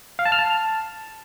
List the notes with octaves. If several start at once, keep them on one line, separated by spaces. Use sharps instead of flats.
F5
A5
F6
A5